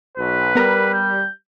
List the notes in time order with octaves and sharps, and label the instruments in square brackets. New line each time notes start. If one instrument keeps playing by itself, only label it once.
[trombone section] B1 [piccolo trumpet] B4
[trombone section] G3 [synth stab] B3 A#4
[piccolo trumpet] G6